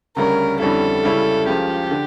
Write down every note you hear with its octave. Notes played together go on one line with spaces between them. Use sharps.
D2 C#3 G3 C#4 A#4
F2 D3 G3 C#4 E4 A4
C#2 C#3 G3 C#4 E4
C#2 C#3 F3 G4
D3